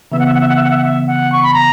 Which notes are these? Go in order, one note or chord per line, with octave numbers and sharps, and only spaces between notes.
C#3 E3 B3 E5
F#5
E5
F#5
E5
F#5
E5
F#5
E5
F#5
E5
F#5
C#6
B5
A#5